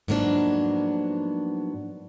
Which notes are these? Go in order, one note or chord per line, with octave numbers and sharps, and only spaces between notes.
G#2 F3 F#3 A#3 B3 D4